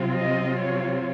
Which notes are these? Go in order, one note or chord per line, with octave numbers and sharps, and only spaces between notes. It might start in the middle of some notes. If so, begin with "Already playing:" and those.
Already playing: C3 F#3 C4 F4
D#5
C#5